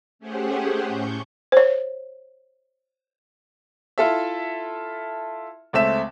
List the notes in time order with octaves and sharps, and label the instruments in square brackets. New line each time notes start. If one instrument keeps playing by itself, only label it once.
[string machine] A3 C#4 G4 G#4 C5 F#5
A2 C#6 G6
[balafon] C5 C#5
[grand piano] E4 F4 A4 E5
C#2 A3 C4 E5 E7